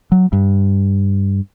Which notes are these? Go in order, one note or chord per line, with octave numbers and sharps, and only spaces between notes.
F#3
G2